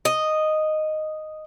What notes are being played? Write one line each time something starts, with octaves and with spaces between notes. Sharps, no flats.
D#5